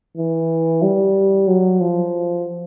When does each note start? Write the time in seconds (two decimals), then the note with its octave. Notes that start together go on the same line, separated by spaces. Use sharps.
0.17 E3
0.82 G3
1.48 F#3
1.81 F3